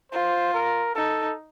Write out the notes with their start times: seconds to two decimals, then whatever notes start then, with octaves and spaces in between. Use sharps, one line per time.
0.12 F4 C5
0.54 A#4
0.95 D#4 A4